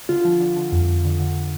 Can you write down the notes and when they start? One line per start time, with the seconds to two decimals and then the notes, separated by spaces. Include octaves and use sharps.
0.09 D3 F4
0.25 F3
0.40 D3
0.56 D3
0.72 F2
0.89 F2
1.05 D3
1.19 D3